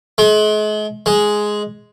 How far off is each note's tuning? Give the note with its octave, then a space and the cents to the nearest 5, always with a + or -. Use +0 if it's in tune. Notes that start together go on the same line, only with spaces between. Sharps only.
G#3 +40
G#3 +5